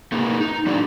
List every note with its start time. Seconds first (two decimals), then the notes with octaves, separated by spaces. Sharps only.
0.12 A3 A#3 D#4 F4 G#4 A#4
0.40 D#4
0.66 F#3 D4 F#4 G#4 D5